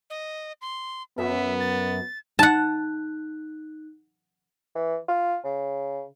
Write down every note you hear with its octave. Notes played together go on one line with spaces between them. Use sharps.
D#5
C6
F#2 B3 E5
A6
D#4 F#5 A5 F#6
E3
F4
C#3